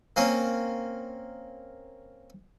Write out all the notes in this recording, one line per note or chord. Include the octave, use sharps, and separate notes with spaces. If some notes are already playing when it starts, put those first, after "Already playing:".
A#3 C4 C#4